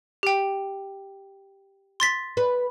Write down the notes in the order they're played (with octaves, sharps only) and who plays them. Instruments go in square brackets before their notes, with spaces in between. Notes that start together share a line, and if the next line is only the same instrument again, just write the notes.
[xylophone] G4 G5
C6 A6 B6
[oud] B4